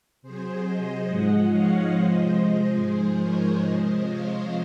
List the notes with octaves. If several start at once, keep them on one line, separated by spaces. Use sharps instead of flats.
C3 F#3 G#4 C5
C5 D#5
G#2 F3 G#3 D#5 F#5
C#5 F5
C3 F3 G#3 C5 D#5
C5 D#5
G#2 F3 G#3 G#4 C5
A#4 C#5
C3 F3 G#3 C5 D#5
C#5 F5